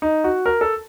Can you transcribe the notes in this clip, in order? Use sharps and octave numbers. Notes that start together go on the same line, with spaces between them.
D#4
F#4
A#4
A4